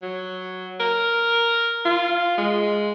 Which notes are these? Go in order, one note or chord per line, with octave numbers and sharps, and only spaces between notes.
F#3
A#4
F4
G#3